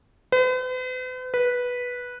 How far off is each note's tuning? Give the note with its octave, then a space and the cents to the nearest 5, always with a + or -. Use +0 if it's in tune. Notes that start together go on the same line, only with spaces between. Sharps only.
B4 +45
B4 -10